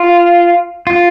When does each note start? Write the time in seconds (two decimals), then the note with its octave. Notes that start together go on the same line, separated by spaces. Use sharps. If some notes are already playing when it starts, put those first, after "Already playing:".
Already playing: F4
0.87 F4